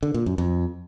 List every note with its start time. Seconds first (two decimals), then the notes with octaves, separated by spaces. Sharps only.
0.03 D3
0.14 A#2
0.26 F#2
0.38 F2